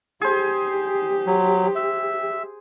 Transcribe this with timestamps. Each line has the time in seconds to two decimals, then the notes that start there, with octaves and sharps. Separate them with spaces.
0.21 G4 G#4 C5
1.27 F#3
1.75 E5